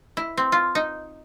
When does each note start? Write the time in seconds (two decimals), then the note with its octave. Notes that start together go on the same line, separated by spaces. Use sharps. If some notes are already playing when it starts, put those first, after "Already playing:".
0.17 E4
0.37 C4
0.52 F4
0.75 D#4